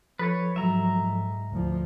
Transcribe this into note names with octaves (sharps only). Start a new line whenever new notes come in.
F3 A4 B4 C#5 A6
G#2 F#3 E5 A#5
G#2
D2 F3